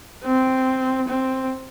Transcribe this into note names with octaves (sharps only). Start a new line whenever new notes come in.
C4
C4